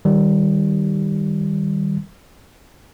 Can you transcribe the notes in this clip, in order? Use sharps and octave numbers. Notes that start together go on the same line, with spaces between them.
D#3 G3